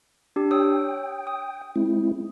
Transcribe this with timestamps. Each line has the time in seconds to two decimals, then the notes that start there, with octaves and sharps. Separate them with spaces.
0.36 D4 G4
0.51 C#5 G5 D#6 E6
1.27 D#6
1.76 G#3 C4 E4